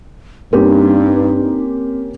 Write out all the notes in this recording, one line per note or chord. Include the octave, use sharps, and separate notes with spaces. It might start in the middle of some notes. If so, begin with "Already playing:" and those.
G2 A#3 C4 C#4 D#4 G4